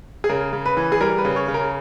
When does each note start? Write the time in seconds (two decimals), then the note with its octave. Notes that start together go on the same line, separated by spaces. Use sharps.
0.24 G#4
0.29 C#3 A#4
0.53 C#3
0.66 B4
0.77 E3
0.92 G#4
1.01 G3 A#4
1.18 B4
1.25 C#3
1.36 C#5
1.48 C#3
1.54 A#4